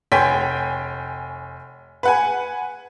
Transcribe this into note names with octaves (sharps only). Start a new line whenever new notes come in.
F1 C#5 G5 G#5 C6 B6
B4 F#5 G#5